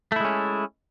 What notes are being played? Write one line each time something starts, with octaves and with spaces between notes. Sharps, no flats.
G#3 A3 C#4 E4